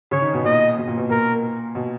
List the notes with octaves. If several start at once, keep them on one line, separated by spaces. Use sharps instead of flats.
C#3 C#5
D#3
B2
A#2 D#5
B2
A#2
B2
A#2 A#4
B2